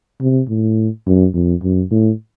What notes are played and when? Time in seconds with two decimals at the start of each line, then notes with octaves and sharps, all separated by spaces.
0.21 C3
0.49 A2
1.07 F#2
1.34 F2
1.63 F#2
1.91 A2